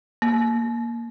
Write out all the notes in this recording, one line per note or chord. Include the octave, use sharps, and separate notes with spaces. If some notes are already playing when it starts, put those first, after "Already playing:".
A#3